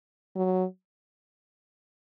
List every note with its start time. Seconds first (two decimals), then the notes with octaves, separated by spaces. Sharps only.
0.36 F#3